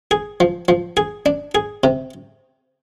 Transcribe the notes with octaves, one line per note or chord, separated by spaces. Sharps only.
G#4
F3
F3
G#4
D4
G#4
C3